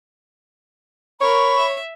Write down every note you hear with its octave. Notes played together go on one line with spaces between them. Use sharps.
A#4 C#5 B5 C#6
E5